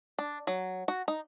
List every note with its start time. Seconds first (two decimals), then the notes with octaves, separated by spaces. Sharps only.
0.19 D4
0.47 F#3
0.88 F#4
1.08 D#4